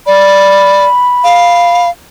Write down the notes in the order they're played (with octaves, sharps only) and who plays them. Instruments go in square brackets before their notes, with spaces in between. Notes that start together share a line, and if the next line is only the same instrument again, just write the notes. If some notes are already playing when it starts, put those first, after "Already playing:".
[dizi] D5 [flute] B5
[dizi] F5